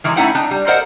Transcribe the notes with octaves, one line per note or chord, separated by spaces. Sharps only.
D#3 E3 F#3 G#3
A3 C#4 D#4 E4 F#5 G5
D4 D#4
G3
A4 A#4 C5 D#5 F#5